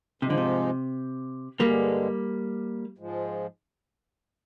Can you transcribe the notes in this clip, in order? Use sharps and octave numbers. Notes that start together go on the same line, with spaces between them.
G#2 C3 F3 G#3 D#4
D3
C3
G2 D3 G3 G#3 A#3
G#2 F3 G#3